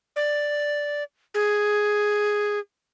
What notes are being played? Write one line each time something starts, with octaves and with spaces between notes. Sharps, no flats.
D5
G#4